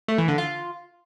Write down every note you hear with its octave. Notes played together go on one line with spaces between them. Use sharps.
A3
E3
D3
F4